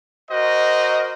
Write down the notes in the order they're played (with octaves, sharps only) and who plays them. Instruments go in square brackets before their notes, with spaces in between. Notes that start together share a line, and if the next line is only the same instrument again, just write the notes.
[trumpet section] F#4 A#4 C5 D#5